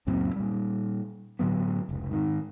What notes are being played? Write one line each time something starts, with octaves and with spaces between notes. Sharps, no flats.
C#2 F#2 A#2 C4
A#2 G3
A2 D3 F#3 B3
F1 C#2
G#2 D#3